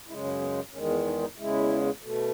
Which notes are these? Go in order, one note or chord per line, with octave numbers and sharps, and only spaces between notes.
F#2 C#3 G#3 E4
C#4
B3
E2 D#3 G#3 C#4
B3
D#4
D#4
E2 C#3 G#3 E4
B2 A3